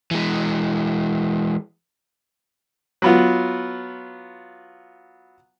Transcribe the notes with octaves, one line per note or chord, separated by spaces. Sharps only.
E3 G#3
F#3 B3 F4